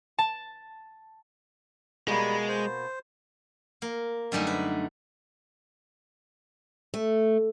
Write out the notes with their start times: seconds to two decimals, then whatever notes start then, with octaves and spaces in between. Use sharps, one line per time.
0.18 A5
2.08 B2 G3 G#3 A#3 B5
2.49 C5
3.82 A#3
4.32 F#2 D3 G3 A3 D#4
4.47 B4
6.94 A3